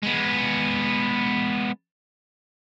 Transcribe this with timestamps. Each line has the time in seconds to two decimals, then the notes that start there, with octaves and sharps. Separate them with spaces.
0.03 G#3 B3